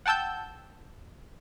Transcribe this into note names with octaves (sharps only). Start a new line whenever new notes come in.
F#5 G5 A5 E6 G6